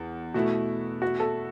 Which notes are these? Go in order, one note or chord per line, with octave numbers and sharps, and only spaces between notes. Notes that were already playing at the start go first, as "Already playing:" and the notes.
Already playing: E2
B2 A3 E4 F#4
F#4
A4